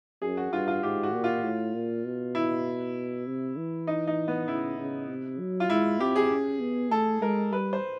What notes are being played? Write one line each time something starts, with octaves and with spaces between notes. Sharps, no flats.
F#2 G#4
F#4
G2 F4
F4
G#2 G4
F#4
A#2
F4
A2
A#2
B2
E4
C3
E3
D#4
D#4
B3
C#3 E4
C#3
C3
F#3
F4
G#3 E4
C4 G4
G#4
C#4
B3
A3 A4
G#3 A#4
G3 B4
C5